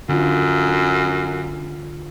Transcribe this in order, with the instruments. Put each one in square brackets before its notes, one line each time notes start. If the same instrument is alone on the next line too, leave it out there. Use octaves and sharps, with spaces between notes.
[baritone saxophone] F#2 [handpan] D3 F4